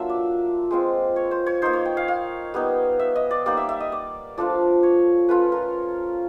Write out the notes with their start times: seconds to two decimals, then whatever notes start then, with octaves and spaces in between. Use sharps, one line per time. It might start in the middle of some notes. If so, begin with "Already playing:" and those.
Already playing: F#3 A#3 D4 F4 E5
0.09 D5
0.71 G#3 C4 F4
1.16 C#5
1.31 C5
1.46 C#5
1.62 A#3 D#4 C5
1.73 C#5
1.86 G5
1.97 F5
2.08 F5
2.54 G3 B3 D#4
3.00 E5
3.16 D#5
3.31 D5
3.46 G3 A#3 D#4 D5
3.57 E5
3.69 E5
3.80 D#5
3.92 D5
4.38 F3 A3 D4 F4 D5
4.83 C#5
5.29 A3 C#4 F4 B4
5.52 A#4